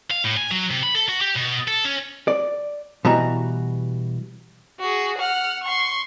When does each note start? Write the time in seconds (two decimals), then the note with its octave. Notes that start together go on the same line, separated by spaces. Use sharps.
0.11 F5
0.24 A2
0.37 G#5
0.51 F#3
0.71 C3
0.83 B5
0.95 A4
1.08 F#4
1.21 G4
1.36 B2
1.68 A4
1.85 C#4
2.28 D5
3.05 B2 E3 G3 F#4 A#5
4.79 F#4 G#4
5.18 F#5 F6
5.64 C6 C#6